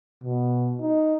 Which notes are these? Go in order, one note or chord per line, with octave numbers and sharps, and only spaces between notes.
B2
D#4